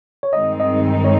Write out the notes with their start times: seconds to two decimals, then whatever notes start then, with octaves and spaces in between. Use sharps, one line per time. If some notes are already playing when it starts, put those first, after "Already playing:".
0.23 C#5
0.33 G2 D#3 G#3 C4 D#4 D#5
0.60 D#5
1.04 C#5